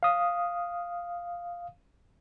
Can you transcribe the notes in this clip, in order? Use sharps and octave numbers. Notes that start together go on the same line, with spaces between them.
F5 D#6